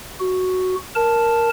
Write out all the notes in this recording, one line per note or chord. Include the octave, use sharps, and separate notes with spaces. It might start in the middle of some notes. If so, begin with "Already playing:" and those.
F#4
A#4 A5